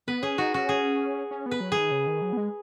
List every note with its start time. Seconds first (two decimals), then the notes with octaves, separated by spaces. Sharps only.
0.08 B3 B4
0.22 C#4 G#4
0.38 D#4 F#4
0.54 C#4 F#4
0.69 G#4
1.31 C#4
1.46 B3
1.51 B4
1.60 F#3
1.72 G#4
1.77 D#3
1.91 C#3
2.07 D#3
2.22 F#3
2.33 B3
2.37 G#3